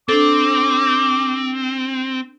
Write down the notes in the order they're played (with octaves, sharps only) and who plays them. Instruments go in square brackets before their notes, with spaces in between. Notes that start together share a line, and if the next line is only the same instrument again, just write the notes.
[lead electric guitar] C4 [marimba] D4 A4 [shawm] D6